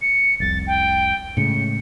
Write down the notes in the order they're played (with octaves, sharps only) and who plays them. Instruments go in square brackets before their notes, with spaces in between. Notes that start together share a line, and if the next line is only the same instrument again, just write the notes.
[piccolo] C#7
[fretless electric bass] F1 C2 [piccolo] A6
[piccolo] G5
[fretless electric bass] A2 C#3 G#3 [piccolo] C#7